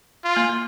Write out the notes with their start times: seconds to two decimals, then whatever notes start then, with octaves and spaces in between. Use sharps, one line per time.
0.24 F4
0.36 A#3
0.49 A#3